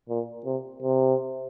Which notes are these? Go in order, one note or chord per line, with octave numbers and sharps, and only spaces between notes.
A#2
C3
C3